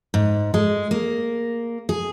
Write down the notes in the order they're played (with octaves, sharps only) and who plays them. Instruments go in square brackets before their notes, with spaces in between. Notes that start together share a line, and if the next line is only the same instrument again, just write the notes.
[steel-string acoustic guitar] G#2
G#3
A#3
G#4